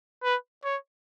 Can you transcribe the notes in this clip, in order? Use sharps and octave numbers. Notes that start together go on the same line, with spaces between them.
B4
C#5